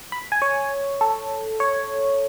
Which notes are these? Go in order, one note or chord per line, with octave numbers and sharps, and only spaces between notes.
B5
G#5
C#5
A4
C#5